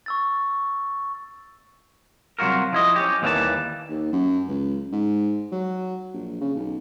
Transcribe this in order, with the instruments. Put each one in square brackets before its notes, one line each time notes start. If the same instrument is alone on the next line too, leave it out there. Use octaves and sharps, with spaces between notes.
[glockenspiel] C#6 E6 A6
[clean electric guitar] C2 F#3 F4 F#4 A#4
F3 E4 D#5
C#4 G4
D#2 A#2 E3 G3 A#3 A5
[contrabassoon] D#2
F#2
C#2
G#2
F#3
A#1
C#3
B1